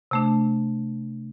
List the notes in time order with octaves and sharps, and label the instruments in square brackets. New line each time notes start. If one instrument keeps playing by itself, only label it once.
[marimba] C3 A3 D4